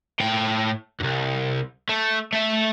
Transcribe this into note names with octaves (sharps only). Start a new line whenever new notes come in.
A2 G5
C2 G2
A3
A3 E5